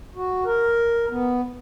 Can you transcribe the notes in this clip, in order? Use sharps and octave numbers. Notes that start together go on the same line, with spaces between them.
F#4
A#4
B3